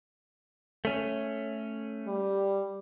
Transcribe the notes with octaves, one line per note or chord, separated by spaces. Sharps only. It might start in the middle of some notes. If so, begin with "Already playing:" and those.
A3 C#4
G3